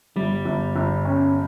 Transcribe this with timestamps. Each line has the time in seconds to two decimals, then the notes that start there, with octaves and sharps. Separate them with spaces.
0.16 G1 G3
0.45 G1
0.76 G1
1.05 C#4